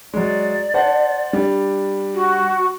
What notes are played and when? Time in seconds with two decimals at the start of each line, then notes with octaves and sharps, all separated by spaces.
0.14 F#3 G#3 D5
0.74 C5 F#5 A5
1.33 G3 D4
2.14 F#4